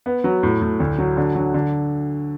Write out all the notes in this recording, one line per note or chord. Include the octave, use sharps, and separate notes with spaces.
B3
F#3
A2
A2
D2
F#3
D3
F#3
D3